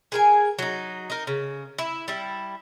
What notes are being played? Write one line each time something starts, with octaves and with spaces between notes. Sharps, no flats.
G#4 A#4 G#5
F#3 D#4
D#4 A#4
C#3
E4
G3 E4